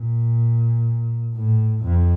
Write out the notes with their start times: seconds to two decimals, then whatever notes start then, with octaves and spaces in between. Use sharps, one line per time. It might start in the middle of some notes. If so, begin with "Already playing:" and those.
Already playing: A#2
1.36 A2
1.84 F2